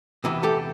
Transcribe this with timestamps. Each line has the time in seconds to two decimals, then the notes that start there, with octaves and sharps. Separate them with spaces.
0.24 E2 C3 E3
0.43 G4 A4